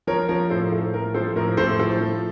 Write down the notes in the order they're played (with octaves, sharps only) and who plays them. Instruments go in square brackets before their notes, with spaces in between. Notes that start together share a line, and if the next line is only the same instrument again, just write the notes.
[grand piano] F3 A#4 C#5
F3 A#4 C#5
A2 A4 C5
A2 A4
F3 A#4
F3 A4 C5
A2 A#4
A2 A4 C5
F3 A4
F3